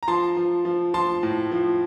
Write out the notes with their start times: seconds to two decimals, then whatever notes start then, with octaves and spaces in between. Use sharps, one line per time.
0.03 A#5
0.08 F3 A5 C6
0.37 F3
0.65 F3
0.94 F3 A5 C6
1.23 A2
1.51 F3